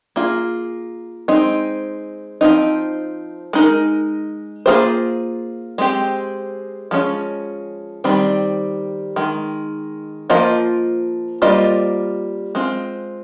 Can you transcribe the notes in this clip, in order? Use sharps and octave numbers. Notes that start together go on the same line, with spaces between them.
A#3 F4 G#4
G#3 C4 D#4
F3 C4 D#4
G#3 D#4 A#4
A#3 C#4 F4 G#4 C5
G#3 C4 G4
F3 G#3 C#4
D#3 G3 C4
D#3 G#3
F3 A#3 F4 C5 D#5
G3 A#3 F4 C5 D#5
G#3 C4 F4